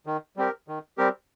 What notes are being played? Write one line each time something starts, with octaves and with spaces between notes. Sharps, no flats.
D#3
G3 C4 G4 A#4
D#3
G3 C4 G4 A#4